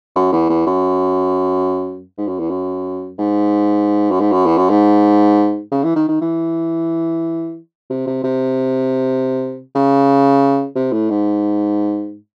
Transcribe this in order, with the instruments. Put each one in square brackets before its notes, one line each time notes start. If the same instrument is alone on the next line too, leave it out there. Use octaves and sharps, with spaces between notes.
[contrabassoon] F#2
E2
E2
F#2
G#2
F#2
E2
F#2
G#2
F#2
G#2
F#2
E2
F#2
G#2
C#3
E3
D#3
D#3
E3
C3
C3
C3
C#3
C3
A2
G#2